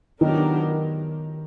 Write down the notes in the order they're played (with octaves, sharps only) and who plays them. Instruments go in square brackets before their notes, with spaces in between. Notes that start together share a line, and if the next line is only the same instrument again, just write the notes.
[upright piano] D#3 [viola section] F#3 B3 D4 G4 A#4